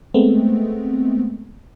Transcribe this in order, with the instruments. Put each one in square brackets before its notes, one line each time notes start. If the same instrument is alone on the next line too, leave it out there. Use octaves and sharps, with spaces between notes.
[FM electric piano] G#3 A3 B3 C4